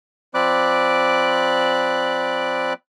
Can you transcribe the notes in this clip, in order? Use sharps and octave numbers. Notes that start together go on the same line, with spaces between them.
F3 C4 D5 B5 D6 F#6